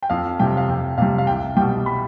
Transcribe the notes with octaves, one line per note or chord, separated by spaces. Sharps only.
G5
F2 F5
C3 G3 G5
F5
F2 G5
C3 G3 F5
F5
C2 G5
B2 G3 G5
B5